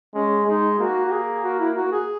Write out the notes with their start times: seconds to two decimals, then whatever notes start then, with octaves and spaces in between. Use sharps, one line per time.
0.14 G#3 C#4
0.47 G#3 D#4
0.79 A#3 F#4
1.06 F#4
1.12 G#4
1.44 F#4
1.59 E4
1.76 F#4
1.92 G#4